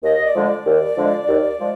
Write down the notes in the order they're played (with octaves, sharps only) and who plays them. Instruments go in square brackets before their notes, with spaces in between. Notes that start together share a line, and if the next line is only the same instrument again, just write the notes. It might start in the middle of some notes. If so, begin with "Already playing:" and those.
[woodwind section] D#2 D#5
D5
D3 F3 G#3
D5
D#2
D3 F3 G#3
D#2
F3 G#3